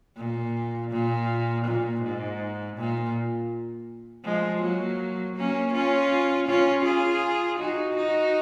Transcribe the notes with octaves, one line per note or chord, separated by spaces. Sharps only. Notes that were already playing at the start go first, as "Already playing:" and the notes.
A#2
A#2
A#2
G#2
A#2
F3 G#3
F#3 A#3
A#3 C#4
C#4 F4
C#4 F4
F4 G#4
D#4 F#4
D#4 F#4